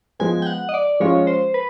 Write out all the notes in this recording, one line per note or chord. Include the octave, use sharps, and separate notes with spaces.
F3 G#3 B3 G#5
G5
F#5
D#5
D5
F3 G#3 C#4 F4 C#5
C5
B4